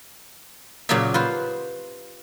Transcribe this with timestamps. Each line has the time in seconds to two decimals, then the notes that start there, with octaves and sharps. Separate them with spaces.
0.89 A#2 C#3 F#3 G4 C#5 E5
1.14 F4 B4 C5